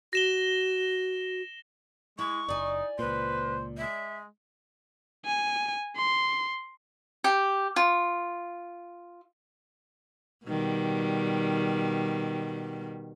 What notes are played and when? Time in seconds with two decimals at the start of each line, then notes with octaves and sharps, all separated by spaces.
0.13 F#4 A#6 E7 G7
2.19 G#3 E4 C#6
2.49 F#1 D#4 D5 G#5
2.99 C#2 A#2 B4 C5
3.77 G#3 E5
5.25 G#5
5.97 C6
7.24 G4
7.76 F4
10.46 B2 D#3 G3